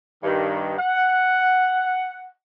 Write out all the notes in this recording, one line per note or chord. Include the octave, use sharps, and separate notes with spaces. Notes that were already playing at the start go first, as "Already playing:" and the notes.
G2 D#3
F#5